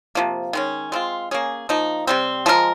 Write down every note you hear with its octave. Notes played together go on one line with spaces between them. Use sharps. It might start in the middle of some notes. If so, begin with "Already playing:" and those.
C3 F3 A#3
D#3 G#3 C#4
G#3 C4 F4
A#3 C#4 G#4
F3 A#3 D#4
C3 G3 C4
F3 G#3 D#4 A#4